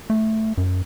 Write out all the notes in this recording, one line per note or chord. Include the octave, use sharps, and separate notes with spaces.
A3
F#2